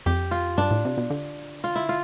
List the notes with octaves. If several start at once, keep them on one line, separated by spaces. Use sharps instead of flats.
F2 G4
F4
G2 D4
A2
C3
B2
D3
F4
E4
F4